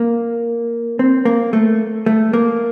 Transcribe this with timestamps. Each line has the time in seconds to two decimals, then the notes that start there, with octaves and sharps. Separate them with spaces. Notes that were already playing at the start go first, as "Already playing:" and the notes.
Already playing: A#3
0.99 C4
1.25 A#3
1.53 A3
2.06 A3
2.33 A#3